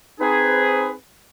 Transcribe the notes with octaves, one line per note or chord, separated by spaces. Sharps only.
C4 D#4 G#4 B4